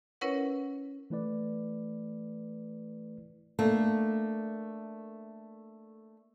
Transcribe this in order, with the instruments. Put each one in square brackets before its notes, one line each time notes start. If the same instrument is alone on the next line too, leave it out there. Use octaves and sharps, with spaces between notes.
[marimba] C#4 E4 A#4 B4 C#5 F#5
[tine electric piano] E3 A3 E4 B4 D5
[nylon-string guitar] A3 A#3 D4